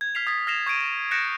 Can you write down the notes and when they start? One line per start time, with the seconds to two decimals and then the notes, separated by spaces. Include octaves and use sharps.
0.01 G#6
0.15 F6 B6 C7 F7
0.27 D#6 G#6 A6 B6
0.47 F6 A#6 C7 E7 F7
0.66 C#6 G#6 B6 D7 D#7
1.11 F#6 G6 A#6 C#7 D7 E7